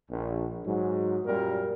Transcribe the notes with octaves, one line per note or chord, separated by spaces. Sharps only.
A#1
G#2 F#3
F#2 A#2 G3 A#4